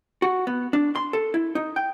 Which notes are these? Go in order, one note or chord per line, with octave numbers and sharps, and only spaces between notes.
F#4
B3
D4
C6
A4
E4
D#4
G5